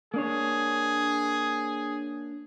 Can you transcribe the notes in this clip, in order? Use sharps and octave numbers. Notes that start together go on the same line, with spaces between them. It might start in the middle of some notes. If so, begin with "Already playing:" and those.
A#3 D4 G#4 C#5